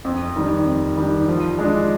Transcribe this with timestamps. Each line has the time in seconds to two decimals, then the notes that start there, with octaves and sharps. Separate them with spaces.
0.05 F2
0.36 D#3 G3 D4
0.65 F2
0.97 D#3 G3 D4
1.28 F3
1.59 G#3 D4